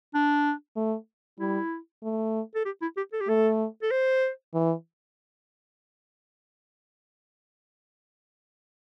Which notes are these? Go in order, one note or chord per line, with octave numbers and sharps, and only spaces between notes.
D4
A3
G3 E4
A3
A4
G4
E4
G4
A4
G4
A3 A4
A4
C5
E3